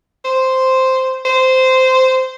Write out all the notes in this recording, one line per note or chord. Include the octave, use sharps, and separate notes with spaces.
C5
C5